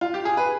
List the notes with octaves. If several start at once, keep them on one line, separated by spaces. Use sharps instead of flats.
F4
G4
G#4
B4